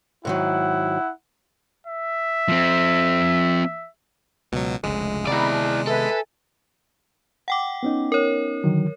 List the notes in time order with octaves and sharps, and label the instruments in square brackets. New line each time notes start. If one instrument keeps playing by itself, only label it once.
[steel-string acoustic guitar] G#2 D#3 F#3 [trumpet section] E4 F#5
[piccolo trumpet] E5
[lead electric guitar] F3 C4
[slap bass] C#2 [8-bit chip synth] B2 F#3
[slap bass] F1 C#2 D3 [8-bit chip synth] G#3
[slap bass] C3 D#3 B3 [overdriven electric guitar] E4 D5 [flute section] F#5 A#5 B5
[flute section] A5
[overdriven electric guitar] A4 [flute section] B4 E5 G#5
[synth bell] F#5 G5 D6
[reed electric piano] B3 C#4 D#4
[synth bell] A#4 C#5
[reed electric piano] D3 D#3 F#3